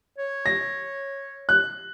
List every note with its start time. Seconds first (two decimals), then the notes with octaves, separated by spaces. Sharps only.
0.18 C#5
0.46 A#6
1.49 F#6